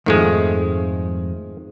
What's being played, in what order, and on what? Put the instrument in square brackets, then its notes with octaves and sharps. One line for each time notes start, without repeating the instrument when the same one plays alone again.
[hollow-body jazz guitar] F2 G#2 A3 [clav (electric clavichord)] D#3 F3 G#3